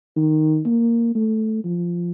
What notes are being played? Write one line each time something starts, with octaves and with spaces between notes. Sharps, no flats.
D#3
A#3
A3
F3